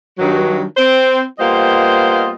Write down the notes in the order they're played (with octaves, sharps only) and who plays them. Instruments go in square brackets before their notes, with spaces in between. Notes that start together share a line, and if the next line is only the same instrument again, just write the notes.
[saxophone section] G2 D#3 F#3
C4 C5
G3 A#3 B3 F4 C5 D#5